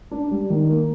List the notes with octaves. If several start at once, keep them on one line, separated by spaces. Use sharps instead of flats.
D4
G3
D#3
A#3